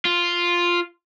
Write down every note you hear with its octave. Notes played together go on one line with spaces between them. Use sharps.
F4